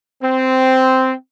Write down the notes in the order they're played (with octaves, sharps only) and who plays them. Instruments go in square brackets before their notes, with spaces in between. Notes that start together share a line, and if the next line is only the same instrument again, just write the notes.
[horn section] C4